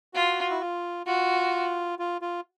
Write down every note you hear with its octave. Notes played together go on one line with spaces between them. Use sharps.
F4 F#4
E4
F4
F4 F#4
F4
F4